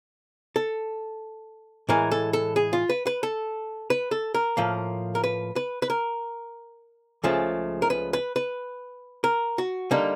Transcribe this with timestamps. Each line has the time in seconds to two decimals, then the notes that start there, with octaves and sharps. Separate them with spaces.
0.56 A4
1.89 A2 E3 G#3 A#4
2.11 A4
2.33 A4
2.56 G#4
2.73 F4
2.89 B4
3.07 B4
3.23 A4
3.90 B4
4.11 A4
4.34 A#4
4.57 A2 F3 A#3
5.15 A#4
5.24 B4
5.56 B4
5.82 B4
5.90 A#4
7.24 C#2 C#3 F3 A3
7.82 A#4
7.90 B4
8.13 B4
8.36 B4
9.24 A#4
9.58 F#4
9.91 D3 G3 A#3 D#4